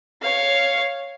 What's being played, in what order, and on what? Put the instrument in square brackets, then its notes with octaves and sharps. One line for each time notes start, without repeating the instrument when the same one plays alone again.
[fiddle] C#5 F5